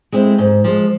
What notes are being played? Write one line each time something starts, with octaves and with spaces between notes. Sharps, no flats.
G#3 C4 E4
G#2
F3 G#3